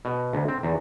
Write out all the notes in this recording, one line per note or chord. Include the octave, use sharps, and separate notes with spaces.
B2
D2
C4
E2